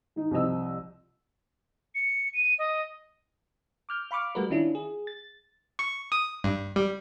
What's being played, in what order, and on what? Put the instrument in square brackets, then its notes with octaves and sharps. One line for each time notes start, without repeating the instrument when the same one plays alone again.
[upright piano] D#3 D#4
C2 F3 C4 D#5 E6
[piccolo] C#7
D#7
D#5
[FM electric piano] D6 F6 G6
F5 B5 C#6 D6 F6
G3 A3 F#4 A#4 B4
D#3 C#4 D4 E4 F4
G#4
A6
[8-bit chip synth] C#6
D#6
G2
G3